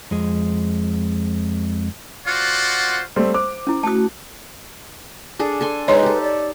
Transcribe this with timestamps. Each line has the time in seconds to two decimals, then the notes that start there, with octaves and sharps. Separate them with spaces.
0.11 F2 G#3
2.26 F4 F#4 C5 D5 F#5
3.16 G3 A3 C4
3.34 C5 D6
3.67 C#4 E4
3.83 A3 F#4 A5 D#6
5.39 D4 G#4 A4
5.61 A4 G#5 C6
5.88 G#3 D#4 B4 C#5 D#5 C6
6.03 G4 A4
6.22 D5